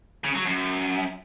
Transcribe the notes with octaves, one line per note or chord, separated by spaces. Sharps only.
C#3
F#3
F#2